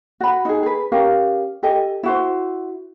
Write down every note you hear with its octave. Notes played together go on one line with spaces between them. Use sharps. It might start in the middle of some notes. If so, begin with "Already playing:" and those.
F#4 B5
D#4 G#4
G#4 B4
C#4 G4 A#4 F5
G4 A4 D#5 G#5
E4 F#4 C5